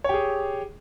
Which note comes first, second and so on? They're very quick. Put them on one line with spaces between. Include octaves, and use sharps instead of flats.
C#5 G4 G#4